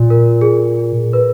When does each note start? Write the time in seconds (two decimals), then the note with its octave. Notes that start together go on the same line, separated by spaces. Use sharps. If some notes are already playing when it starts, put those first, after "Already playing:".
Already playing: A#2
0.10 A#4
0.41 G#4
1.13 B4